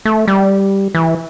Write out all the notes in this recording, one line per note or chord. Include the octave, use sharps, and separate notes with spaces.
A3
G3
E3